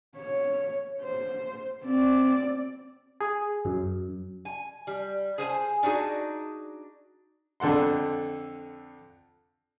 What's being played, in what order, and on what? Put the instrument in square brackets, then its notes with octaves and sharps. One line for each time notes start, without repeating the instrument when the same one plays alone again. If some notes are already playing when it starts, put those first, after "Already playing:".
[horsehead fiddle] C#5
C5
C4 D5
[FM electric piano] G#4
F#2
[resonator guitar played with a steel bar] G#5
G3
G#4 C5 G#5
D4 D#4 F#4 G#4
[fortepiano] F2 D3 A4 F#5 C6